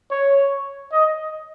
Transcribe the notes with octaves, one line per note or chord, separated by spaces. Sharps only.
C#5
D#5